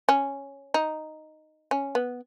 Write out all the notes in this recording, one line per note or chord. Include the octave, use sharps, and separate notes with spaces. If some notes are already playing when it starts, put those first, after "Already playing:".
C#4
D#4
C#4
B3